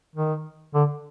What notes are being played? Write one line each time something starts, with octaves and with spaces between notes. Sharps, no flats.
D#3
D3